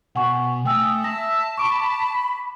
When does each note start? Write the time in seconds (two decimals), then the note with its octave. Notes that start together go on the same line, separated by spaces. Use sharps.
0.15 B2 F#5 G#5 C#6
0.65 A3 G5 G#5 D#6 E6
1.04 E5 A5 E6 A#6
1.57 B5 C#6 D6 D7